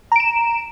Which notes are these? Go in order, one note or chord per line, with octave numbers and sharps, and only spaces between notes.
A#5 D7 E7